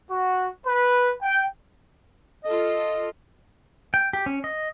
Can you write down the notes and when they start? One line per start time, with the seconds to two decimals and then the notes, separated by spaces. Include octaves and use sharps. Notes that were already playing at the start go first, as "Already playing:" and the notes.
0.10 F#4
0.66 B4
1.22 G5
2.44 F4 A4 D#5
3.94 G5
4.13 G4
4.26 C#4
4.44 D#5